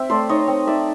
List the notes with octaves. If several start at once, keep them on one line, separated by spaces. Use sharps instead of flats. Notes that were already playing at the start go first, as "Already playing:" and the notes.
Already playing: C4 E5 G5
A3 C5 D5
D#4 C#5 D#5
C4
D#4 D5 E5